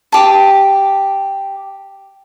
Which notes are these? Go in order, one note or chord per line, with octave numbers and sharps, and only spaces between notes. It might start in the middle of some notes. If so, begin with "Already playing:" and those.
G4 A5